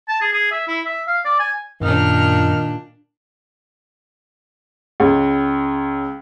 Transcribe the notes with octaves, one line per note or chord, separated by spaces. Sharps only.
A5
G#4
G#4
E5
E4
E5
F5
D5
G#5
F#2 A#2 D#3 D4 D#4 F6
C#2